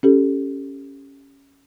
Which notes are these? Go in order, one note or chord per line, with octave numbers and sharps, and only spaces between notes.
C#4 G4 A4